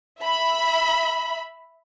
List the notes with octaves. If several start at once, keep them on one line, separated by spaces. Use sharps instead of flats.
E5 B5